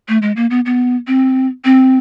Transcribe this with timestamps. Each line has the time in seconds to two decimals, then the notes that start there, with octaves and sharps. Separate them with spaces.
0.08 A3
0.22 G#3
0.36 A#3
0.50 B3
0.66 B3
1.07 C4
1.65 C4